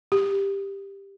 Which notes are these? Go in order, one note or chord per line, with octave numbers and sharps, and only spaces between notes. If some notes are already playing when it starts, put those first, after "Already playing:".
G4